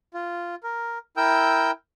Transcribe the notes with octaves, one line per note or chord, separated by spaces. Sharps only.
F4
A#4
E4 A#4 G5 E6 G6